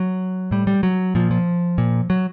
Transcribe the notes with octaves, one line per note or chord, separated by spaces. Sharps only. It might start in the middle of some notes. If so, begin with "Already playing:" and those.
Already playing: F#3
A2 G3
G3
F#3
A#2 F3
F3
A#2
F#3